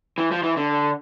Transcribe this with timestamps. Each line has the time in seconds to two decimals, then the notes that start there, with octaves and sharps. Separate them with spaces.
0.18 E3
0.31 F3
0.43 E3
0.57 D3